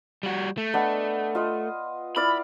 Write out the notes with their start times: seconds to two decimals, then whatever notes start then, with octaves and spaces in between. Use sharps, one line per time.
0.23 G3 F#4
0.58 A3
0.74 B3 D4 D#5
1.35 F4 D#5
2.16 E4 D5 F5 B5